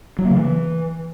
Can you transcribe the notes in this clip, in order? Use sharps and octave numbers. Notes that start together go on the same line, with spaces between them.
F#3
A#3
C#3
E3